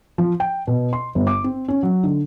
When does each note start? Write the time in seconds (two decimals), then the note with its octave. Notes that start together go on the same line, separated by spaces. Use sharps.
0.18 F3
0.40 G5
0.67 B2
0.93 C6
1.15 G1
1.27 D6
1.44 C4
1.68 C#4
1.83 F#3
2.03 D3